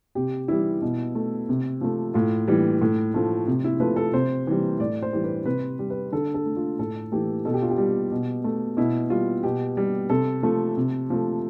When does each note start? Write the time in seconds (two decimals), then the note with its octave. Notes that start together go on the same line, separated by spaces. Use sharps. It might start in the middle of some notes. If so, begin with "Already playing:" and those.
0.15 C3 G4
0.48 E3 G3 E4
0.82 B2
1.15 A3
1.49 C3
1.81 F3 A3
2.14 A2 F4
2.48 E3 G3
2.81 A2
3.14 F3 A3
3.47 C3
3.64 E4
3.80 F3 A3 B4
3.96 A4
4.13 C3 C5
4.47 E3 G3
4.80 A2 D5
5.03 C5
5.13 E3 G3
5.24 B4
5.45 C3 B4
5.79 G3
5.90 B4
6.12 D3 A4
6.34 A4
6.46 A3
6.56 F4
6.79 A2 A4
7.12 E3 A3 G4
7.45 B2 A4
7.54 G4
7.62 F4
7.70 G4
7.78 G3
8.12 B2
8.44 A3
8.77 B2 E4
9.10 G3 F4
9.43 B2 G4
9.77 G3
10.10 C3 A4
10.43 F3 A3
10.77 C3
11.10 F3 A3